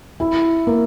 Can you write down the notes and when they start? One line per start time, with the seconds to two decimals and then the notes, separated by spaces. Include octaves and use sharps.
0.20 E4
0.67 A#3